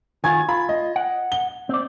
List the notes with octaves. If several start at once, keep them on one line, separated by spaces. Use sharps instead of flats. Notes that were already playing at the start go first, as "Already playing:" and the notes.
D#3 F4 F#4 G#5 G#6
F4 B5
D#5
F#5
G7
C4 D5